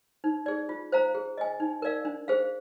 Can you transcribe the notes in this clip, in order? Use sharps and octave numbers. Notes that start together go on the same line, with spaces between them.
D#4
G#4 D5
F4
C5 F5 A#5
G#4
D#5 G#5
D#4
A#4 D5 F5
D4
G#4 C5 F5